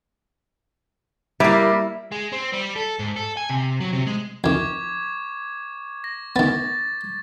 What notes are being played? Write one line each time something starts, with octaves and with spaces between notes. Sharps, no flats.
G3 A#3 E4
G#3
C4
G3
A4
G#2
A4
G#5
C3
F#3
C3
G#3
F2 D#3 C#6 D6 G#6
A#6
D#3 B3 A6